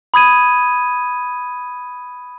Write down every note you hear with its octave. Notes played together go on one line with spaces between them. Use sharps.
B5 D#6 G#6 D#7